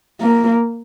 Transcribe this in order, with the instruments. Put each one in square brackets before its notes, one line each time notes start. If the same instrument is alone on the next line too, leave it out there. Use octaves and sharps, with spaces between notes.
[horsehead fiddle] A#3